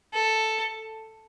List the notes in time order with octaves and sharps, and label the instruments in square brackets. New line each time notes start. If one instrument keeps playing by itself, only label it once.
[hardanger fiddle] A4